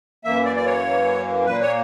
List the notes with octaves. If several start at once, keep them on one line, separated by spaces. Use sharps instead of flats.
F#2 E3 A#3 E5
D5
D5
C#5
A#2 A#3 B4
C#5